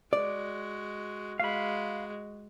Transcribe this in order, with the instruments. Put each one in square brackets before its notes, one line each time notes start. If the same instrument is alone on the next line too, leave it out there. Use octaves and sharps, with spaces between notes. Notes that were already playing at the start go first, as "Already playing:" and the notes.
[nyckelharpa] G#3 F#4 [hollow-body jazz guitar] D5
[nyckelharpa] G#3 F#4 [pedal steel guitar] F5 B5